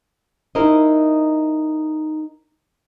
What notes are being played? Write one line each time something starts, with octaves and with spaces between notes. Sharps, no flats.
D#4 E4 A#4 C5 D#5